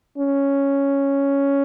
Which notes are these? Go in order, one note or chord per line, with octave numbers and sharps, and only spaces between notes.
C#4